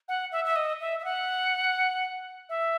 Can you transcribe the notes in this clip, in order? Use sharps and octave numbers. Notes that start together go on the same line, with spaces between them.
F#5
E5
E5
D#5
E5
E5
F#5
E5